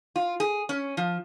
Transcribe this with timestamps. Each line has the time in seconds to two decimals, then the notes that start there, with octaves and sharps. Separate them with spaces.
0.16 F4
0.40 G#4
0.69 C#4
0.97 F3